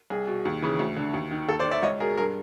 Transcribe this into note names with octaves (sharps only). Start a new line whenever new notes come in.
C2 G#4
B2
D#2
C#3 E3
D2
D3
D#2
D#3
D#2 A4
C5 D5
D#3
D5 E5
C#2 C#5 D#5
B2 G#4 A#4
G2 G#4 A#4